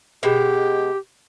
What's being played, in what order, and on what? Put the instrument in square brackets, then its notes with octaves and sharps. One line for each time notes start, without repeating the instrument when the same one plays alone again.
[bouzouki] B2 G#3 [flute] G4